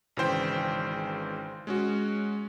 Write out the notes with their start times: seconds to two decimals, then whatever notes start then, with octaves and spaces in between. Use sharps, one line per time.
0.17 G#1 C#3 E3 C5 G5
1.67 G#3 C#4 F#4